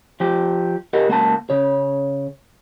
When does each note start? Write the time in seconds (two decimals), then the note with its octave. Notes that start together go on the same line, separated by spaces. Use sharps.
0.20 F3 G4
0.93 G4 A#4 D#5 F#5
1.08 C#2 A#3 F#5 A5
1.50 C#3 C#5